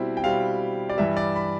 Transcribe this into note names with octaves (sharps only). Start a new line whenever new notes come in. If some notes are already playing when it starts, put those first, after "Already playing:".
Already playing: B2 G3 C4 E4
G5
B2 G3 C4 E4 F5
D5
G2 E3 G3 E5
D5
B5